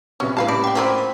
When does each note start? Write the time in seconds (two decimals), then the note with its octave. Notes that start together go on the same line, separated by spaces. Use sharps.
0.20 A#1 C3 B3 C#4
0.37 A2 G3 B4 F5 A5
0.48 A#3 C#4 D5 B5
0.64 F#5 G5
0.75 F3 A#3 C4 F#5 A#5 C#6